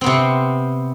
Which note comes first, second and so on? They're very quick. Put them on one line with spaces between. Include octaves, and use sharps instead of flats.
C4 B3 C3